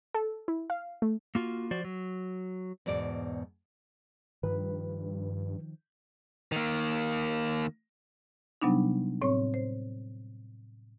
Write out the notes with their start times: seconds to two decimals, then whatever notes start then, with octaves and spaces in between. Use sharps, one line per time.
0.14 A4
0.48 E4
0.70 F5
1.02 A3
1.35 A#3 F4 F#4
1.71 F3 F#4 C5 D5
1.84 F#3
2.86 E2 G#2 B2 D5
4.43 G2 D#3 F3 B4
6.52 D#3 A#3
8.62 C3 F#3 G3 B3 D4 D#4
9.22 A2 C4 C#5 C#6
9.54 C5